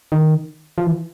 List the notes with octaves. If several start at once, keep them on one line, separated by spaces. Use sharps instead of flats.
D#3
F3
E3